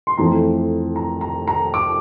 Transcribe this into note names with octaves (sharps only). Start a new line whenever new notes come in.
C6
F2 E3 A3 A#5
A#5
A#5
A#5
D6